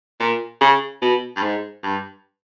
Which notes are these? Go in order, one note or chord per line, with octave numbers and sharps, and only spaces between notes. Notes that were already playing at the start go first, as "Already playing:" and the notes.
A#2
C#3
B2
G2
G#2
G2